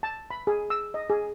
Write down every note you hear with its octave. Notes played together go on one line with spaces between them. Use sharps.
A5
B5
G#4
E6
D#5
G#4